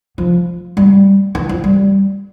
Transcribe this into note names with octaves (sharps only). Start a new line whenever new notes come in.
F3
G3
E3
F3
G3